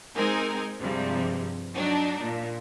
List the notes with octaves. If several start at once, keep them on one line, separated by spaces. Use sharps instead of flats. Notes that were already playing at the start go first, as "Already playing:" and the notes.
G#3 C4 D#4 A#4 G#5
G2 C3 F3 G3 G#3
F#3 D4 D#4
A#2